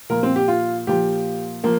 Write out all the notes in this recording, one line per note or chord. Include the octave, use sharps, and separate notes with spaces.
A#2 F3 A#4
C4
G4
F4
A#2 F3 G4
F3 A#3